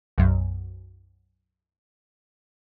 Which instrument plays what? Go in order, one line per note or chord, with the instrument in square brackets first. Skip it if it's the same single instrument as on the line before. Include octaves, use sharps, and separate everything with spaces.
[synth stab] B1 F#2